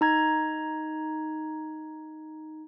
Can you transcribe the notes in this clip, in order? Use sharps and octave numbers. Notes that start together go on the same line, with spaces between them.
D#4 A#5 G#6